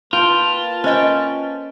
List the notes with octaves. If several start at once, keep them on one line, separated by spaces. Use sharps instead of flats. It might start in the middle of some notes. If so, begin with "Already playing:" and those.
A#3 F4 B4 G5 A5
C#4 C5 D#5 G5